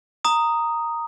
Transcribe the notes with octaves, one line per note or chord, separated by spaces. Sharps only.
A#5 D#6